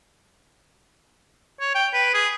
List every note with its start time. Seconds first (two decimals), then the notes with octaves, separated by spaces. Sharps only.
1.61 C#5
1.75 G5
1.94 B4
2.14 G#4